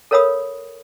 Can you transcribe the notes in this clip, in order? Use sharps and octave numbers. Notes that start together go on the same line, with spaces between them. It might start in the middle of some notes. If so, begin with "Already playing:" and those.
A4 A#4 C#5 F5 B5 D#6